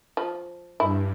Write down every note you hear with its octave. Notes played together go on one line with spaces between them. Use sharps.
F3
G2 E4